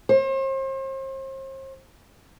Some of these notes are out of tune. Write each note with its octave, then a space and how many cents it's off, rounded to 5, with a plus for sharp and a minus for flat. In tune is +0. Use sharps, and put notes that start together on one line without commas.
C5 +40